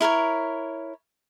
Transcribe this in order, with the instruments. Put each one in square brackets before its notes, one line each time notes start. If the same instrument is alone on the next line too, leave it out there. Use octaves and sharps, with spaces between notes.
[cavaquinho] E4 A#4 B4 C#5